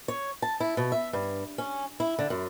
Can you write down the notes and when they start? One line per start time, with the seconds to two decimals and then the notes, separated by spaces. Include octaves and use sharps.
0.08 C#5
0.42 A5
0.60 E4
0.77 B2
0.92 E5
1.13 G2
1.58 C#4
2.00 E4
2.19 D3
2.30 F#2